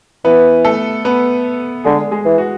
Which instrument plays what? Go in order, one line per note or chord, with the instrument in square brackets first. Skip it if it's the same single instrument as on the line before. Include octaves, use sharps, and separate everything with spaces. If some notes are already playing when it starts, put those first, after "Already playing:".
[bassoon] E3 [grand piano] B3 B4
[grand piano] A3 A4
B3 B4
[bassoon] D3 [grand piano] G#3 G#4
[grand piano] G#3 G#4
[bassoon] E3
[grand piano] F#4